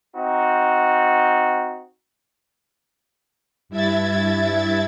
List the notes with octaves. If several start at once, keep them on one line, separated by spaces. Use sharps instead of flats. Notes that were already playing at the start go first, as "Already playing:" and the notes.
C4 D#4 F#4
G2 E4 E5 G#6 A6